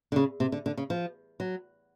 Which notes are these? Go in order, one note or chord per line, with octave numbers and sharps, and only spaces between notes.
D3
C#3
C3
D3
D3
C#3
F3
F#3